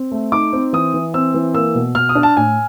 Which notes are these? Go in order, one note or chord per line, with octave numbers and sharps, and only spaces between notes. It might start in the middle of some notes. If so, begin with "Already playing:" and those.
Already playing: C4
A3
D#4 D6
C4
E3 D#6
E3
C4 E6
E3
A#3 E6
B2
B2 F6
D#6
D4
A5
A2 G#5